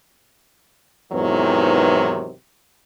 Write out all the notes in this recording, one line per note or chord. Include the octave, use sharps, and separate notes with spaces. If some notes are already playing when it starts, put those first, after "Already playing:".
E2 G#2 C3 D#3 E3 F#3